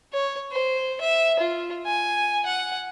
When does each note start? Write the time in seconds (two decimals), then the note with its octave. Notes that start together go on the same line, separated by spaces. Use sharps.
0.13 C#5
0.52 C5
1.01 E5
1.40 F4
1.86 G#5
2.46 F#5